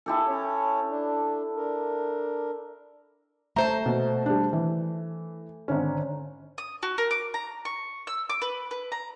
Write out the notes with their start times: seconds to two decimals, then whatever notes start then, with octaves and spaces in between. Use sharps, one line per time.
0.06 E4 G4 A4
0.28 C#4 C#5
0.90 D4
1.56 D4 A#4
3.56 A3 C5 A5 A#5
3.86 B2
4.26 G3 D4
4.53 E3
5.68 G#1 D3 C#4
6.58 D#6
6.83 F#4
6.98 A#4
7.11 D6
7.34 A#5
7.65 C#6
8.07 E6
8.30 D6
8.42 B4
8.71 B4
8.92 A#5